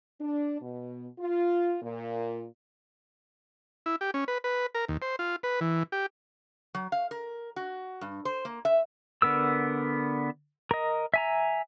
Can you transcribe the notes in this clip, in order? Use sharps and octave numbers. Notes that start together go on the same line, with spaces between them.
D4
B2
F4
A#2
E4
G4
C#4
B4
B4
A#4
D#2
C5
F4
B4
E3
G4
F#3
F5
A#4
F#4
G2
C5
A#3
E5
D3 B3 A#4 E6
A#4 D#5
E5 G#5 A#5